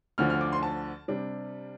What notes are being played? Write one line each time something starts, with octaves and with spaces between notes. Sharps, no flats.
D2 D3 F3 F6
F6
D6
C6
A5
C3 G3 D4